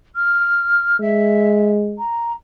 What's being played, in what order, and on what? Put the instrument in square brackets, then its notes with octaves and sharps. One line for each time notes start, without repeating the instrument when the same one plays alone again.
[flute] F6
[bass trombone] G#3 [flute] E5
[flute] A#5